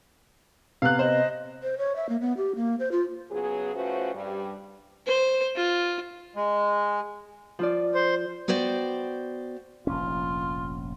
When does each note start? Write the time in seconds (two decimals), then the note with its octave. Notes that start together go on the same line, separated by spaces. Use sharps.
0.82 C3 B3 F5 F#6
0.99 C5 D#5
1.63 C5
1.78 C#5
1.96 E5
2.09 A#3
2.21 B3
2.37 G4
2.56 A#3
2.79 C5
2.92 F4
3.31 C#3 F#3 B3 G#4
3.75 F3 A3 C#4 F#4 B4 C5
4.15 G2 G3
5.07 C5
5.56 F4
6.36 G#3
7.59 F3 F4 D5
7.95 C5
8.48 B3 F#4 C5 D5 G5
9.87 F1 A#1 C#4 F4